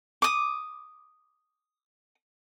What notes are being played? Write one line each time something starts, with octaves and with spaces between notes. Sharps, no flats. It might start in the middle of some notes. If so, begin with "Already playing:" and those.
D6 D#6